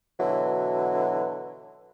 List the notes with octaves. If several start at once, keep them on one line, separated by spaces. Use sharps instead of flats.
B2 D3 E3 F#3